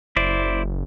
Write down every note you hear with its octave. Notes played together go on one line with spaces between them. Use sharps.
F#1 E4 C5 D5